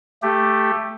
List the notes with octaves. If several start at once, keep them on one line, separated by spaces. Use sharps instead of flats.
A3 G4